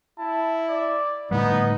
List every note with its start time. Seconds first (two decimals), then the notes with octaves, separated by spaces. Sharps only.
0.18 E4 A5
0.69 D5
1.31 A2 D3 G3 B3 D#4